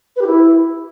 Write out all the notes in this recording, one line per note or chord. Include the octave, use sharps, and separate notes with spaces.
B4
G4
E4